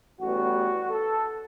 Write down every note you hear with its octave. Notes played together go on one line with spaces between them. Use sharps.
A1 A2 G3 B3 F#4
A4